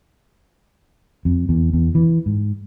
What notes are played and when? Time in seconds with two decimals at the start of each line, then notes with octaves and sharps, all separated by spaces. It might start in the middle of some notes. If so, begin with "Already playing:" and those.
1.25 F2
1.49 E2
1.73 E2
1.95 E3
2.26 G#2